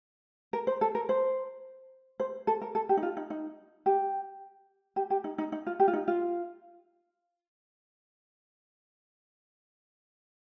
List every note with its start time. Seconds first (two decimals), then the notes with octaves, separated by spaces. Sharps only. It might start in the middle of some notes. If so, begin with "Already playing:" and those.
0.53 A#4
0.67 C5
0.81 A4
0.95 A#4
1.09 C5
2.20 C5
2.47 A4
2.62 A#4
2.75 A4
2.89 G4
2.97 D#4
3.03 F4
3.17 D#4
3.30 D#4
3.86 G4
4.96 G4
5.10 G4
5.24 D#4
5.38 D#4
5.52 D#4
5.67 F4
5.80 G4
5.88 F4
5.93 D#4
6.08 F4